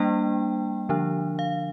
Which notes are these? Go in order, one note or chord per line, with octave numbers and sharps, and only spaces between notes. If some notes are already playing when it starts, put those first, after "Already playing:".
Already playing: G3 A#3 D4 G5
D3 F3 D4
F5